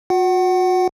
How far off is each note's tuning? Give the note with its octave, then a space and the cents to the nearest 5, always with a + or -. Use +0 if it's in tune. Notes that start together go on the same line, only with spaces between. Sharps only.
F#4 -40 F#5 +20